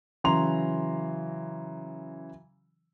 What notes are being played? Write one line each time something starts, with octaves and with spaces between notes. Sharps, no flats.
C#3 E3 F#3 A#5 C6 F7